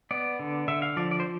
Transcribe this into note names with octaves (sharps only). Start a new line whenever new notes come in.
B3 D5
D3
D3 E5
F5
F3 D5
D5
C5